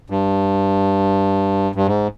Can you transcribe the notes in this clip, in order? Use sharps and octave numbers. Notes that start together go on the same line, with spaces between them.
G2
G2
G#2